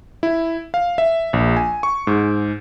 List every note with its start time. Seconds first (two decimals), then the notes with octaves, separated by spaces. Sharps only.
0.23 E4
0.74 F5
0.98 E5
1.33 A#1
1.57 G#5
1.83 C#6
2.07 G#2